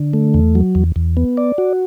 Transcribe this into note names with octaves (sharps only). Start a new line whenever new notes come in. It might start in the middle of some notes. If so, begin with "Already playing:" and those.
Already playing: D3
A3
E2
F#3
E2
E2
B3
D5
F#4